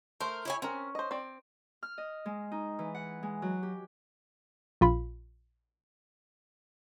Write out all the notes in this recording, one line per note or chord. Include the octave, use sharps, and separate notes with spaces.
A3 A#4 C5
E4 C#5 G#5
C4 C#4 A#4
C5 D#5
C4 D5
F6
D#5
G#3
D#4
E3
F#5
G#3
F#3
G4
A#1 F4 B5